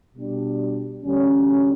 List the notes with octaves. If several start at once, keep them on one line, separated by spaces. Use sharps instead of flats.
B2 G3 D4
D2 D3 G3 C#4